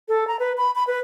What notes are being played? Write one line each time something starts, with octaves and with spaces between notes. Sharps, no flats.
A4
A#5
B4
B5
B5
B4